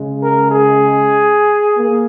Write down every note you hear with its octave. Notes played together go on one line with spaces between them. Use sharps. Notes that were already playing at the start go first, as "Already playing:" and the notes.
Already playing: C#3 G#3
A#4
G#4
A#3